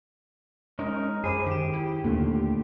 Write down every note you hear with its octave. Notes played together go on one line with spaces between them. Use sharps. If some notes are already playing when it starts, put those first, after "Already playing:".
G#3 C#4 D#4 A#4
F#2 G#4 C5 B5 D6
F#2 D#3 G4 D6 E7
E4
D#2 A#2 D3 D#3 A3